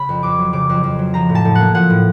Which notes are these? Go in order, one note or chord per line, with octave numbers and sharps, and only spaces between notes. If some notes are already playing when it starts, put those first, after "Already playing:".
Already playing: C#3 B5
F2
F2 D6
F#3
C#3 D6
F2
F2
F#3
F3 A#5
A2
A5
A2
A#3 F#5
F3 F#5
A2